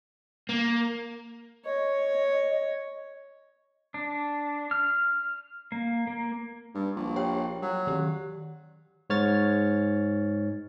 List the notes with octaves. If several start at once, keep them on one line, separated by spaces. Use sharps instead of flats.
A#3
C#5 D#5
D4
F6
A#3
A#3
G2
A#1
G4 C#5 G5
F#3
D#3 G4
G#2 C#5 F6 A6